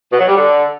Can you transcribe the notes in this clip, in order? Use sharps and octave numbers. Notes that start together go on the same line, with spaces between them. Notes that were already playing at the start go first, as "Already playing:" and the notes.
B2
F#3
G3
D3